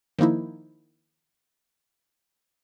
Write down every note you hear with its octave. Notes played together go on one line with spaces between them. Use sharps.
D#3 F3 A#3 D#4 E4